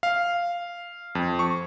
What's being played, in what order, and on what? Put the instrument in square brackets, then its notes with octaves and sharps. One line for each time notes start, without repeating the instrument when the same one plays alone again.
[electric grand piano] F5
F2
C#6